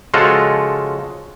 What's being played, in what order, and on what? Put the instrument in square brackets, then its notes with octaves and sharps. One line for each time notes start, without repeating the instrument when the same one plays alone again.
[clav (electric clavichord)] C#3 F3 G#3 F4 F#4 A4